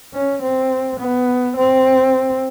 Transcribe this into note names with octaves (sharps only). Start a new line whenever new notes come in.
C#4
C4
B3
C4